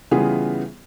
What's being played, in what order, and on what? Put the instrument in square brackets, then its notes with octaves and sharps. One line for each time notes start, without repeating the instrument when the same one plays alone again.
[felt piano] C#3 E3 G3 B3 F4 G#4